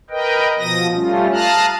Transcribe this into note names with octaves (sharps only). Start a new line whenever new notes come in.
A#4 B4 D#5 G5
B2 F3 D#6 A#6
G3 A3 C#4 F4
F5 A5 A#5 D#6 F6 F#6